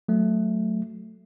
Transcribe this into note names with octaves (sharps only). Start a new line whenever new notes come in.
F#3 A3